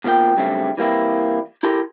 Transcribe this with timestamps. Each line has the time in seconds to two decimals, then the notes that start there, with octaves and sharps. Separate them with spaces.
0.04 B2 F3 A#3 E5 G5
0.37 G2 C#3 F#3 G3 A3 C4
0.77 E3 G3 A#3 C4 E4
1.63 E4 G4 A4 A#4 C6